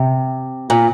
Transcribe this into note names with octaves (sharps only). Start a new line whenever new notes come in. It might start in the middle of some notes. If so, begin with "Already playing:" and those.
Already playing: C3
A#2